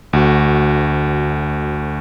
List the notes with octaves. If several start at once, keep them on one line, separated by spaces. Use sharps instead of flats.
D2 F#4